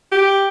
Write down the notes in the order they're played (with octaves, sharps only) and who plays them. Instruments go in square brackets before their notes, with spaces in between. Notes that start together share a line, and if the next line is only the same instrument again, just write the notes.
[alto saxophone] G4